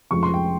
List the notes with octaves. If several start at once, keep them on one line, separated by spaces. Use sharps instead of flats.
F1 F2 C#3 F3 G#3 C#6
C6
G5